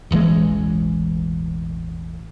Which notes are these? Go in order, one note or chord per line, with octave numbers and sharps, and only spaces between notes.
E1 A1 E3 G#3